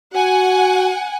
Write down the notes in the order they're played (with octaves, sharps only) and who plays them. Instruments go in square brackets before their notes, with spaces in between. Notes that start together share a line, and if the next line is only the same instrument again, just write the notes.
[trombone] F#4 [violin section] F#5 G#5